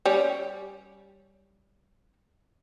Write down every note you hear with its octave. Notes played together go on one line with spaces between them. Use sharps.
G3 C#4